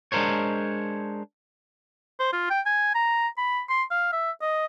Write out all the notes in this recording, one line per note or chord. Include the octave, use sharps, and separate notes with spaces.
G#3 D4 D#4 A#4 C5 C#5
C5
F4
G5
G#5
A#5
B5
C6
F5
E5
D#5